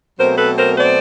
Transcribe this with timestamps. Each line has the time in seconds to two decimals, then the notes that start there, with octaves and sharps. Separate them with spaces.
0.18 B2 F#3 A3 C4 A#4 C5
0.38 A4 B4
0.58 A#4 C5
0.78 C5 D5